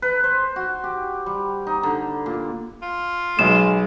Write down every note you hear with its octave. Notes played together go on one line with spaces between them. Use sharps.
B4
C5
F#4
G4
G3
D#4
D3
A#2
F4
B1 G#3 E7